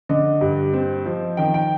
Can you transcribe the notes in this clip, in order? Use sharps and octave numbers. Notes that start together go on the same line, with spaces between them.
D3 D#5
G2
C4
F3
D#3 G5
G5